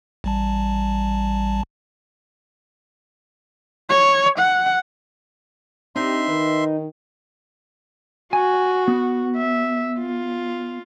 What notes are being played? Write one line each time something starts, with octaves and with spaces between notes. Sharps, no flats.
A1 G3 A5
C#5
F#5
C4 D4 D#4 G4 E5 C6
D#3 B4
F#4 G#5
B3
E5
F4